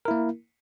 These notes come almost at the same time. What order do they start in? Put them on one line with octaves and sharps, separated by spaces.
A#4 E4 A#3